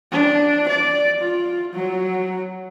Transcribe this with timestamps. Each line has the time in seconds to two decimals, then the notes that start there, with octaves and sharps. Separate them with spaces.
0.12 D4
0.69 D5
1.21 F4
1.73 F#3